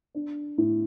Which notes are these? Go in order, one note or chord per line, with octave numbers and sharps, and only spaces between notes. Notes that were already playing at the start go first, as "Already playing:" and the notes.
D4
A2